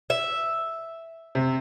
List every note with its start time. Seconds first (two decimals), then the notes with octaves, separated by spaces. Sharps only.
0.10 E5
1.35 C3